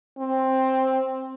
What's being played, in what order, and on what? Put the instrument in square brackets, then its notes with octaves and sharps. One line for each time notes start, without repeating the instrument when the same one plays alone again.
[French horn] C4